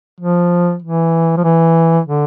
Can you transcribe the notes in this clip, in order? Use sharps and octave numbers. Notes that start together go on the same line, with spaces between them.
F3
E3
F3
E3
D3